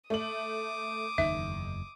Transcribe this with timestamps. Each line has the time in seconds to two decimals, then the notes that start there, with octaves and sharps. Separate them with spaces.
0.10 A3 D6 D#6 F#7
1.18 F#1 E2 D#3 E5